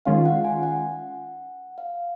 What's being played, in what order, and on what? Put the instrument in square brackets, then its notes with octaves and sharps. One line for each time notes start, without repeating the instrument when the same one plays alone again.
[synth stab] D#3 G#3 C#4 F4 [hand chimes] F5
[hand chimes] F#5
G#5
F#5
F5